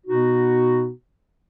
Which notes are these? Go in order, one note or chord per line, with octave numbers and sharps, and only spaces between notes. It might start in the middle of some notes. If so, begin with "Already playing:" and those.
B2 B3 D#4 F#4